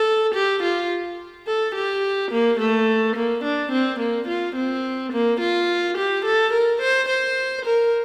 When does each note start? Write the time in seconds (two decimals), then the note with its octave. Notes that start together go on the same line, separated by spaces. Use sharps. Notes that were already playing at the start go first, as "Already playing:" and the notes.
Already playing: A4
0.34 G4
0.63 F4
1.47 A4
1.75 G4
2.32 A#3
2.60 A3
3.16 A#3
3.44 D4
3.72 C4
3.99 A#3
4.28 F4
4.56 C4
5.12 A#3
5.40 F4
5.97 G4
6.25 A4
6.53 A#4
6.82 C5
7.09 C5
7.66 A#4